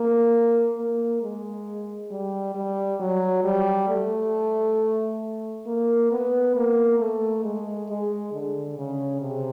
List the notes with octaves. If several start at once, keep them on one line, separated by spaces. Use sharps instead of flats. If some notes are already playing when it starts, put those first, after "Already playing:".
Already playing: A#3
A#3
G#3
G3
G3
F#3
G3
A3
A#3
B3
A#3
A3
G#3
G#3
D3
C#3
C3